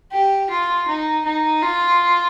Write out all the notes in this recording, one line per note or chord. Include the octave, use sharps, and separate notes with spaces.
G4
F4
D#4
D#4
F4